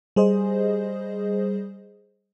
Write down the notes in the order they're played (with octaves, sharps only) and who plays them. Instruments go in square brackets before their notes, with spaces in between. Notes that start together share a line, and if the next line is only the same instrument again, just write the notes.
[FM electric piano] G3 G#4 C5 D#5